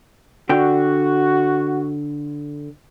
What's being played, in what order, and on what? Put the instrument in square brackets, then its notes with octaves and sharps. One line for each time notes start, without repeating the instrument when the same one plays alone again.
[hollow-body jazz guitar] D3 G5 [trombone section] F#4